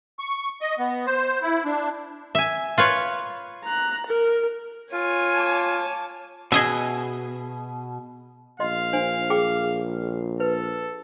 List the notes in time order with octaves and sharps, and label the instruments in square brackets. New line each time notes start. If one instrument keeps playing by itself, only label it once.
[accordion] C#6
D#5
B3
C5
E4
D4
[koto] E5 G#5
F4 B4 C#5
[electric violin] A#5 F#6
A#4
[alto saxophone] F4 [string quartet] C#5 G#5
[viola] A5 D6
[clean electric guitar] B2 [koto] G#4 D#5 E5
[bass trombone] A#1 [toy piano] D#5 C6 [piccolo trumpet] F5
[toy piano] D4 C5 G#5
G#4 G5 D6
[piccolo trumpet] A4 [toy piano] B4